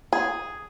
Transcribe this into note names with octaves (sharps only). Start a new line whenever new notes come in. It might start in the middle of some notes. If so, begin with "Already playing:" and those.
G#4